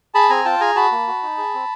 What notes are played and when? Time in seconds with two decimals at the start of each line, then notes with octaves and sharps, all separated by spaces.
0.14 G#4 A5 B5
0.29 C4 G#5 A#5
0.45 F4 G5 A5
0.60 G#4 G#5 A#5
0.76 F#4 A5 B5
0.92 A#3
1.07 F#4
1.23 D#4
1.37 G#4
1.54 C4